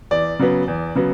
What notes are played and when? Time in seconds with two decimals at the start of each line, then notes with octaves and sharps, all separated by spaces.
0.11 E2 D5
0.39 C#3 F#3 B3
0.68 E2
0.95 C#3 F#3 B3